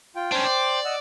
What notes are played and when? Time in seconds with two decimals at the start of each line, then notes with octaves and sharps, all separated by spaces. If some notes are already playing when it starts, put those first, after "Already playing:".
0.15 F4 G5
0.32 C#4 D4 C5 G5
0.44 D5
0.85 D#5 F#5 E6